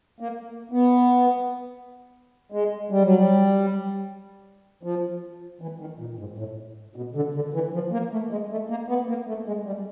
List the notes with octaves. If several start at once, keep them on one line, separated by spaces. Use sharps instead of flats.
A#3
B3
G#3
G3
F#3
G3
F3
E3
D#3
A#2
G#2
A2
B2
D3
D3
E3
F3
A#3
A3
G#3
A3
A#3
B3
A#3
A3
G#3
G3